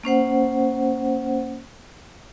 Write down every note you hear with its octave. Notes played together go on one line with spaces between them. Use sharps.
A#3 C#4 C5 F#5